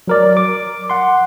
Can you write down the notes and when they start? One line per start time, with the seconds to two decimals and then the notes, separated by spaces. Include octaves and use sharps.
0.08 F#3 A#4 D5
0.37 D6
0.90 F#5 C6